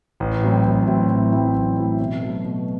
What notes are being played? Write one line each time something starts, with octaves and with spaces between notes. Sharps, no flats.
A1
A2 F#3 C4 E4
A1
A2 F#3 C4 E4
A1
A2 F#3 C4 E4
A1
A2 F#3 C4 E4
B2
F#3 A3
B2